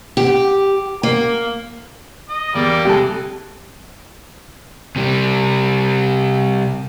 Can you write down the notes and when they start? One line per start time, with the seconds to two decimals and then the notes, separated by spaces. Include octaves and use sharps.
0.17 G4
1.03 A#3
2.29 D#5
2.55 E2 G3 A#3 D5
2.85 C3 E3 G3 G#3 G4 A4
4.96 C3 G3